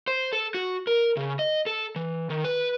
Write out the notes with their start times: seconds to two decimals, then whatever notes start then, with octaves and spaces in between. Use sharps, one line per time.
0.07 C5
0.33 A4
0.54 F#4
0.87 A#4
1.17 C#3
1.39 D#5
1.66 A4
1.96 E3
2.30 D#3
2.44 B4